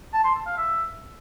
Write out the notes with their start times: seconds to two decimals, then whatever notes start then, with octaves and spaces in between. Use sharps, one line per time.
0.14 A5
0.25 C6
0.35 A5
0.46 F5
0.57 E5